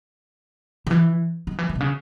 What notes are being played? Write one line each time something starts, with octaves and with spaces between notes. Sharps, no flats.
D#3
E3
D#3
E3
D#3
B2
C#3